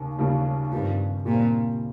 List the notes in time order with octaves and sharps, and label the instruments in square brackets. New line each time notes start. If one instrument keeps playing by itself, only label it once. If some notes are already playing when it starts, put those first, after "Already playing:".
Already playing: [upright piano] D#2 C#3
D#2 C#3 G3
[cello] G2 [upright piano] D#3 G3 C4
[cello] A#2 [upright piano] D#3 G3 C4